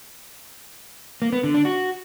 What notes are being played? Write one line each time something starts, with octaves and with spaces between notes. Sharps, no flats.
A#3
B3
D3
D4
F#4